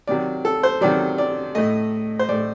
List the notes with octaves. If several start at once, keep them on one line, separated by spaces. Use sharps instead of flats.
C3 D#3 F#3 D5
A4
C5
C3 D#3 F#3 D5
D5
A2 A3 D#5
C5
A2 A3 D5